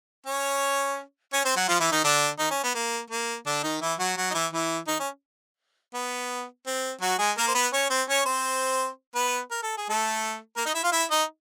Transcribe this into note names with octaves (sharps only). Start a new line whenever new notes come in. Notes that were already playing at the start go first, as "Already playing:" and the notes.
C#4 C#5
C#4 C#5
C4 C5
F#3 F#4
F3 F4
E3 E4
D#3 D#4
D3 D4
D#3 D#4
C#4
B3
A#3
A#3
D3 D4
D#3 D#4
E3 E4
F#3 F#4
F#3 F#4
D#4
E3 E4
E3 E4
D#3 D#4
C#4
B3
C4
F#3 F#4
G#3 G#4
A#3 A#4
C5
B3 B4
C#4 C#5
C4 C5
C#4 C#5
C4 C5
B3 B4
A#4
A4
G#4
A3 A4
A#3 A#4
D#4 D#5
E4 E5
F4 F5
E4 E5
D#4 D#5